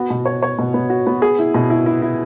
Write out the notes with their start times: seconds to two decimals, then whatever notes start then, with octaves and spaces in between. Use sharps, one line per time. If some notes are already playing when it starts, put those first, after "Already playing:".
Already playing: B3 F#4
0.10 B2
0.26 C#5
0.43 C#5
0.59 B2
0.74 B3
0.90 F#4
1.07 B3
1.22 G#4
1.39 E4
1.54 B2
1.70 E4
1.86 E4
2.02 E4